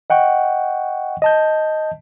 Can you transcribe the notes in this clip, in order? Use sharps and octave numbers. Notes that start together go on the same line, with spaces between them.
D#5 F#5 G5 C#6
D#5 A5 G6